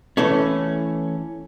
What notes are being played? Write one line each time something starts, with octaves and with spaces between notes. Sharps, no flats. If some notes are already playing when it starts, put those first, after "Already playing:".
E3 A3 C#4